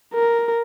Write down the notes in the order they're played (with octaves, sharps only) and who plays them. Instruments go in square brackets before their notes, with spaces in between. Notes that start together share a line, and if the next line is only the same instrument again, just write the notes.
[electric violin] A#4